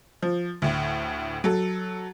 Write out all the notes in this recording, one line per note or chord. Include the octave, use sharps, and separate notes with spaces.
F3
D2 A2
F#3 A4